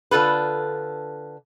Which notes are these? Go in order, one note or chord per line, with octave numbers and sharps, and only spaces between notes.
D3 F4 A4 B4